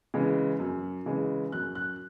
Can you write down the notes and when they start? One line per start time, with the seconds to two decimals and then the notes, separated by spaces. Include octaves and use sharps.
0.14 C#3 E3 G#3
0.60 F#2
1.06 C#3 E3 G#3
1.52 F#2 F#6
1.75 F#6